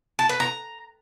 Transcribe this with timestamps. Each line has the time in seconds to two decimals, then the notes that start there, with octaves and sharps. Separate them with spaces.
0.19 A5
0.29 B4
0.40 A#5